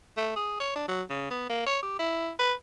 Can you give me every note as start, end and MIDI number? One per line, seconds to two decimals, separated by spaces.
0.17 0.33 57
0.36 0.55 68
0.60 0.71 73
0.75 0.88 62
0.88 1.02 54
1.10 1.26 49
1.30 1.46 59
1.49 1.63 58
1.66 1.79 73
1.82 1.96 67
1.99 2.30 64
2.39 2.53 71